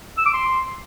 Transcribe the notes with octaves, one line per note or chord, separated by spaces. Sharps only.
E6
D6
C6